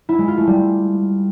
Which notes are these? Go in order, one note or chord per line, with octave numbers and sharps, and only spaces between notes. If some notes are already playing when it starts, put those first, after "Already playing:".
E4
G#3
F4
A3
G3